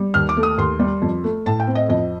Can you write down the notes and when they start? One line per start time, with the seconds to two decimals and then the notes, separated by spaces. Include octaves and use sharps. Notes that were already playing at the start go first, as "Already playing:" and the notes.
Already playing: G3
0.14 D#2 F6
0.29 D6
0.37 A3
0.43 D#6
0.58 D#2 C6
0.79 G3
1.02 F2
1.24 A3
1.46 A2 A5
1.60 G5
1.67 C4
1.75 D#5
1.89 F2 D#5